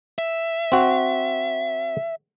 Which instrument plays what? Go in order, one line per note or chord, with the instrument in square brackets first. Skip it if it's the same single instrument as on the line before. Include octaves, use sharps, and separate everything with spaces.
[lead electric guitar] E5
[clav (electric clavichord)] C4 F#4